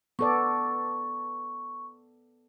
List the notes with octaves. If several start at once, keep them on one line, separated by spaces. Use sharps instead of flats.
B3 A4 D5 C#6